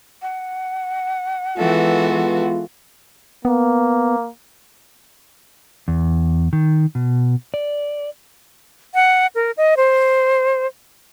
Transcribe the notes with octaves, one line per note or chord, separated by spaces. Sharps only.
F#5
E3 G#3 B3 F4 F#4 A4
A#3 B3
E2
D#3
B2
D5
F#5
A#4
D#5
C5